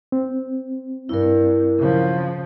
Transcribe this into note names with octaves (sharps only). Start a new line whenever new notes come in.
C4
G2 E4 A#4
C#3 F3